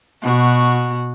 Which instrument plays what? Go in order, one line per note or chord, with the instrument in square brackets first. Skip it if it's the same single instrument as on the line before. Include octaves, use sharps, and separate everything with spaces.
[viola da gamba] B2 F#4